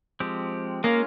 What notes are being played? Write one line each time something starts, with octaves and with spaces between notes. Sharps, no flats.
F3 G#3 C4 G4
G#3 A#3 C#4 F4